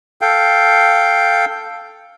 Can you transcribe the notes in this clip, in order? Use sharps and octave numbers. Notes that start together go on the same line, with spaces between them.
A4 F5 G5